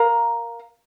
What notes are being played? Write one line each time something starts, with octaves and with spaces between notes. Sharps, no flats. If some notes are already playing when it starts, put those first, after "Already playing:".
Already playing: A#4 F5 A#5